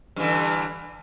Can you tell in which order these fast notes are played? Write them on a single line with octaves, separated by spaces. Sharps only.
G2 E3 D3